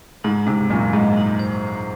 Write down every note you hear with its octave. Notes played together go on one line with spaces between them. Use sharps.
G#2 D#4
G#2 C3 G#3
F#2 A#2 G#3
G#2 D#5
D#4
C5
C5